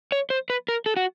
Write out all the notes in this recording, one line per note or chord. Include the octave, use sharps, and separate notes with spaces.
C#5
C5
B4
A#4
A4
F#4